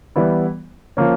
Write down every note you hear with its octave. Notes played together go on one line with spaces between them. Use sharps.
E3 G3 B3 E4
F3 A#3 C#4